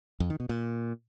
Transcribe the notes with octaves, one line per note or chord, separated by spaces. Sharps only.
F2
D#3
B2
A#2